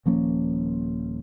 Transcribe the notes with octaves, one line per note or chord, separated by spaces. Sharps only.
D#1 F3 A#3 C#4